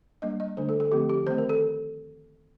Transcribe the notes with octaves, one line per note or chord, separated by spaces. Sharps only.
G3 A#3 D4 D#5
D#5
D3 A3 D4 C5
A4
A4
D3 F3 A3 C4 G4
G4
D#3 A3 C4 C5
A#4
A4